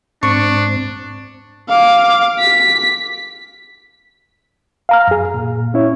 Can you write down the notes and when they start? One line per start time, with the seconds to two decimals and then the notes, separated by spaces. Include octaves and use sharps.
0.23 G#2 C4 D4 C#6
1.69 F5 D6
2.39 B6
4.89 F5 A#5 F6
5.08 F#2 G#4
5.34 A#2
5.74 C#4 E4 C#5